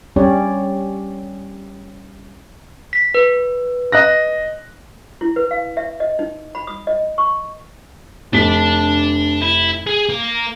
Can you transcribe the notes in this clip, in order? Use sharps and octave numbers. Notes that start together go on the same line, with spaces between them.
G3 C#4 G4 C#5 D5
B6
B4
D#5 F#6 A#6
E4
B4
F5
E5
D#5
D#4
B5
D#6
D#5
C#6
F1 D4 A5 B6
E4
G#4
A#3